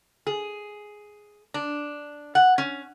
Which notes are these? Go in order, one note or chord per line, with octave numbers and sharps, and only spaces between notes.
G#4
D4
F#5
C#4